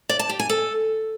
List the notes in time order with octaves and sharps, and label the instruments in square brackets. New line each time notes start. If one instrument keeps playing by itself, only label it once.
[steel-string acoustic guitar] D5
A5
G4
G#5
A4